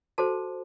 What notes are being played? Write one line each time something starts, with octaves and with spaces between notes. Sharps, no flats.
F#4 A4 C5 A5